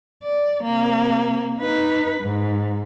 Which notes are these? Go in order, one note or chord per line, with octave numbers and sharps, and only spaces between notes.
D5
C3 A#3
D#4 B4
G#2